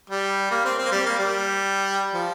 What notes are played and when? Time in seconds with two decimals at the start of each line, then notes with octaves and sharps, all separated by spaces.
0.10 G3
0.51 A#3
0.65 C4
0.79 C4
0.85 A#3
0.92 G3
1.06 A#3
1.19 G3
2.14 F3